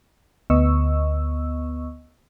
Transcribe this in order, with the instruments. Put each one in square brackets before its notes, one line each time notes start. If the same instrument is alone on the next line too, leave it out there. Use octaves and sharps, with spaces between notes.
[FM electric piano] D2 B3 D#5 C#6 E6